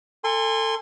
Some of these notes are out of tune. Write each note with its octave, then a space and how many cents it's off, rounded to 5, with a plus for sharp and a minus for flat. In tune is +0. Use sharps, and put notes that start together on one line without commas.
A4 +25 G#5 -30 C6 +0